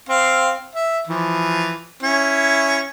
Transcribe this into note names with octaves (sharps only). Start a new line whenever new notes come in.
C4 F5
E5
E3 F3
C#4 E4